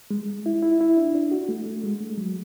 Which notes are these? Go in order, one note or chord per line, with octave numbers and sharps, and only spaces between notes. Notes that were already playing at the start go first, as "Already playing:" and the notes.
G#3
E4
E4
E4
D4
D4
F#4
A3
A3
G#3
A3
F#3